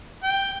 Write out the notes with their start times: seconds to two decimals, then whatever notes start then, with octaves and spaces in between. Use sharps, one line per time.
0.24 G5